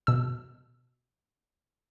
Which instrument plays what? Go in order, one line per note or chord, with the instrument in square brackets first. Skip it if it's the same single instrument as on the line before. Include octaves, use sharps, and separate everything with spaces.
[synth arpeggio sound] B2 E6